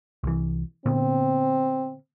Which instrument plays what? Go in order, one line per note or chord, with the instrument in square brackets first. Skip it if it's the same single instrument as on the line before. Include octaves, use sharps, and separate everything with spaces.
[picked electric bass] C2 E3
[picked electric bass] A#2 D3 B3 [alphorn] C4